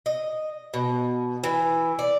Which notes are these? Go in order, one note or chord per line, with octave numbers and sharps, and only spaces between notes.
D#5
B2
E3
D5